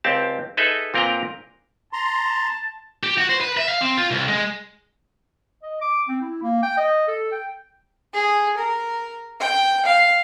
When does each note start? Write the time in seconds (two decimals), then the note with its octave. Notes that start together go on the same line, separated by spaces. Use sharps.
0.04 C#2 C4 G4 A5
0.57 D#4 G#4 A4 B4 D#5 E5
0.94 A#2 C4 A#4 B4 G5 A#5
1.93 A5 A#5 C6
3.03 G4
3.18 F#4
3.29 C5
3.41 B4
3.57 E5
3.68 F5
3.81 C4
3.97 F4
4.11 C2
4.28 G#3
5.63 D#5
5.82 D6
6.09 C4
6.21 E4
6.42 A#3
6.63 G5
6.77 D#5
7.08 A4
7.32 G5
8.14 G#4
8.57 A#4
9.40 G5
9.86 F5